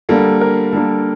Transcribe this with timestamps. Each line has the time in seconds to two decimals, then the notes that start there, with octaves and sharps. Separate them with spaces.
0.09 D3 G3 A#3 A4
0.41 A#4
0.72 D3 G3 A#3 A4